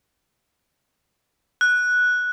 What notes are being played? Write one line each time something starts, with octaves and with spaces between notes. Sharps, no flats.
F#6